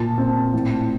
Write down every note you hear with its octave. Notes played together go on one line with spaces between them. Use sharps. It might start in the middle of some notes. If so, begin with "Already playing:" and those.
Already playing: A#2 A5
C4
A2